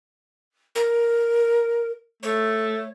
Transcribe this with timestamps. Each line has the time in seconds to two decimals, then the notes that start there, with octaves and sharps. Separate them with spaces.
0.75 A#4
2.23 A3 C#5